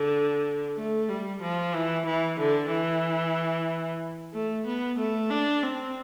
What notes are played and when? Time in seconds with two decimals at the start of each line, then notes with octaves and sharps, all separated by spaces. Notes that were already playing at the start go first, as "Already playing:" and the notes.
Already playing: D3
0.78 A3
1.09 G3
1.42 F3
1.75 E3
2.07 E3
2.40 D3
2.72 E3
4.34 A3
4.67 B3
4.99 A3
5.31 D4
5.63 C4